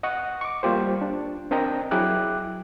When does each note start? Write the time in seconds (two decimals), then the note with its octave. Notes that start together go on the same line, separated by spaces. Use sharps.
0.03 D#5 F#5 C#6
0.41 C#6 D6
0.63 G3 A#3 F4 G4 C5
1.01 D4
1.51 C4 D4 A#4 D#5 G5 A#5
1.91 F#3 E4 G#4 G5 D6 F#6